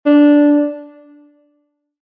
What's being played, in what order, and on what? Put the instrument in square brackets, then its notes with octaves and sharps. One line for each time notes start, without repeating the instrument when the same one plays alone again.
[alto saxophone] D4